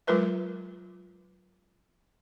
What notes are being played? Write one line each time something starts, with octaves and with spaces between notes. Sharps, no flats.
F#3 G#3 F4 A#4 B4 E5